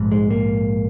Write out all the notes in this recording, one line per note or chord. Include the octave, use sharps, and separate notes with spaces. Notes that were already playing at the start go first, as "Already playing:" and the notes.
Already playing: A#1 G#2
G#3
A#3